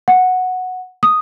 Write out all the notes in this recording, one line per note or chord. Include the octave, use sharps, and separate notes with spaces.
F#5
D#6